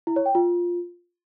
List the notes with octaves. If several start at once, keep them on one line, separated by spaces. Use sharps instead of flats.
E4
C#5
G5
F4